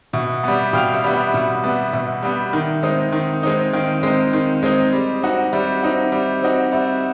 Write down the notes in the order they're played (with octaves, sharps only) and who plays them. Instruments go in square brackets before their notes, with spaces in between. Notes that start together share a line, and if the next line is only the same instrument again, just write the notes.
[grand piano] B2 [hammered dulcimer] E5 F#5
[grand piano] G3 B3
[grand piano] B2 [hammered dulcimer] F5 G5
[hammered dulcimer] E5 F#5
[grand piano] G3 B3
[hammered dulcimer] E5 F#5
[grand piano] B2 [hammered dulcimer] E5 F#5
[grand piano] G3 B3
[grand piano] B2 [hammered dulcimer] E5 F#5
[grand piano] G3 B3
D#3
G#3 C4 D#4
D#3
G#3 C4 D#4
[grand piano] D#3 [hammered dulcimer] F5 G5
[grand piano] G#3 C4 D#4
D#3
G#3 C4 D#4
G3
C4 D#4 F#4
[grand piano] G3 [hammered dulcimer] E5 F#5
[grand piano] C4 D#4 F#4
G3
C4 D#4 F#4
[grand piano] G3 [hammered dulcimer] E5 F#5